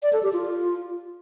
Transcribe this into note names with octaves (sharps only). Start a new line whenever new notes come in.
D5
A4
G4
F4